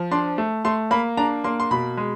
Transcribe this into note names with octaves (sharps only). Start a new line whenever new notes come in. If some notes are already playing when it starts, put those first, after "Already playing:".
Already playing: F3
D4 C6
A3
A3 C6
A#3 B5
D4 A#5
A#3 C6
C6
B2 B5
G#3